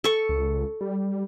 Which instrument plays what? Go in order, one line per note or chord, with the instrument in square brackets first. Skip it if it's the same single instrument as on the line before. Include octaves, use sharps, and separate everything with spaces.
[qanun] A4 C#6
[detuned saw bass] C#2
G3